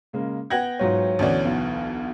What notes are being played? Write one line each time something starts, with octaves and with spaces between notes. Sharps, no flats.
C#3 G#3 A#3
B3 F#5 G5 G#6 A#6 F#7
G#2 F#3 F4 C#5
D2 B2 E3 C#4 D5
B1 B3